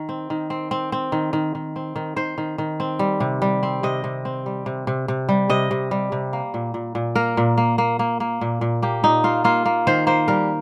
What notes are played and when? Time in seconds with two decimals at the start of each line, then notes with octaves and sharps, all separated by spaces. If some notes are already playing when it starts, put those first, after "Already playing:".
Already playing: D#3
0.09 C4
0.30 D#3
0.50 C4
0.71 C4
0.92 C4
1.12 D#3
1.33 D#3
1.55 D#3
1.76 C4
1.96 D#3
2.16 D#3 C5
2.38 D#3
2.58 D#3
2.80 C4
2.99 G3
3.20 C3
3.42 G3
3.63 C4
3.83 C3 D#5
4.04 C3
4.25 C4
4.46 G3
4.66 C3
4.87 C3
5.08 C3
5.29 G3
5.49 C3 D#5
5.71 C3
5.91 G3
6.12 C3
6.33 A#3
6.54 A#2
6.74 A#2
6.95 A#2
7.16 A#3 A#4
7.37 A#2
7.57 A#3
7.78 A#3
7.99 A#3
8.20 A#3
8.41 A#2
8.61 A#2
8.82 A#3 G4
9.04 A#2 D#4
9.24 A#3 F4
9.44 A#3 F4
9.66 A#3
9.87 D#3 C5
10.07 A#3 C5
10.28 G3 A#4